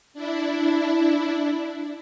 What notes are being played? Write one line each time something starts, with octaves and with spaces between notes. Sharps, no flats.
D4 E4